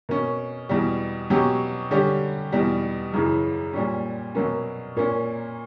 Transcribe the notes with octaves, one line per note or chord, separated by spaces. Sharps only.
B2 A#3 C#4
E2 B2 G3
B2 F#3 C#4 G4
D3 G3 C#4 G4
E2 B2 G3
F#2 C#3 E3
A#2 G3 C#4
B2 F#3 A#3 C#4
A#2 A#3 C#4